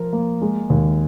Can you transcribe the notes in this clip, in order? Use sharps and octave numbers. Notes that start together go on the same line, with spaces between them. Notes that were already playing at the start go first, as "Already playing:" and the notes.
Already playing: F3 F4 A#4
A#3
G#3
D#2